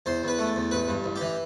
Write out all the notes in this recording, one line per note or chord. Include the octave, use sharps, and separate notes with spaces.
E2 C5
E2 B4
A3
E2
A1 B4
G2
A1
G4
E3